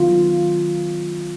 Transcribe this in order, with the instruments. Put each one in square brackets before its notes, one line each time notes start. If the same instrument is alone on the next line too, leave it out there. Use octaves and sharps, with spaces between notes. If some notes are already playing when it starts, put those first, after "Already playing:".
Already playing: [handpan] D#3 F#3 B3 F4